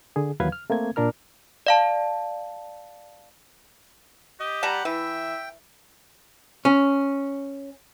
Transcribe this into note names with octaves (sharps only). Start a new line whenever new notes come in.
D3 G#4
D#2 E3 F#3 B4 F5 G#6
F6
A3 A#3 C4 G#6
A#2 D4 A#4 F6
D5 F5 A5
G4 D#5
G3 F#5 A5 A#5
E3 E5 G5
C#4